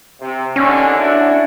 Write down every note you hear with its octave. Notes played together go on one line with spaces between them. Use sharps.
C3
D#2 D3 C#4
D4 E4 F#4